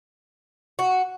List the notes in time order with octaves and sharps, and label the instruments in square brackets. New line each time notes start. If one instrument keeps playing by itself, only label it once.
[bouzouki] F#4